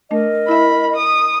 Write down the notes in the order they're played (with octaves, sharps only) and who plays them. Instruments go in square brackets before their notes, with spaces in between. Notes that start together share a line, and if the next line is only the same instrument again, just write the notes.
[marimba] A3 D4 [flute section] A#4 D#5
[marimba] E4 E5 [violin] B5
[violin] D#6